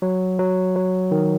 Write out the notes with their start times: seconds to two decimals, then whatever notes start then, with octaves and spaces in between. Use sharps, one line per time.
0.02 F#3
0.39 F#3
0.76 F#3
1.11 D#3